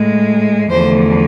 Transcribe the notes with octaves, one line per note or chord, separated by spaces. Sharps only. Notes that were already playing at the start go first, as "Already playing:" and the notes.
Already playing: A2 G#3
E2 D3 F3 A3 C5